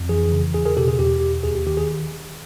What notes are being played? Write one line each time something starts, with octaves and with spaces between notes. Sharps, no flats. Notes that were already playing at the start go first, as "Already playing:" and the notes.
Already playing: F2
E3 G#4
C#3
E2 G#4
G#4 A#4
B2 G4 A4
G#4
E2 G4
B2
D#2 G#4
G4
D#3 G4
G#4